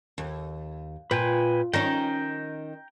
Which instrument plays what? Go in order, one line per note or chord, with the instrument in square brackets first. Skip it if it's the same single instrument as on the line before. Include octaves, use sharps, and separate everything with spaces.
[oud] D#2
[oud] A#2 [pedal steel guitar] B4 G5 G#5
[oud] D#3 C#4 [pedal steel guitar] G5 A#5